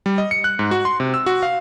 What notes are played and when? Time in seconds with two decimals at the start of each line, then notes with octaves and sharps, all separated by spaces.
0.06 G3
0.18 D#5
0.31 C#7
0.44 F#6
0.59 G#2
0.71 F#4
0.85 C6
1.00 C3
1.14 E6
1.26 F#4
1.43 F5